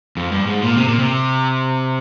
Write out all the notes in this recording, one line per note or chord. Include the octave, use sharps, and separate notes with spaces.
F2
G2
G#2
A#2
C3
A#2
C3